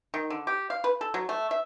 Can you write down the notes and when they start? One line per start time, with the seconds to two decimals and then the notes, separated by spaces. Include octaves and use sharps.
0.14 D#3
0.30 D3
0.47 G4
0.70 F5
0.84 B4
1.01 A4
1.14 F#3
1.29 A3
1.51 E5